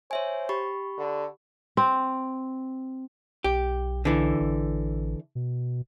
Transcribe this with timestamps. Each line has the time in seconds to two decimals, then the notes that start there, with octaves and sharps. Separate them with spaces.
0.11 C5 C#5 E5 G#5
0.49 G4 B5 C#6
0.98 D3
1.77 C4
3.44 B1 G4
4.05 D3 E3
4.40 A1
5.35 B2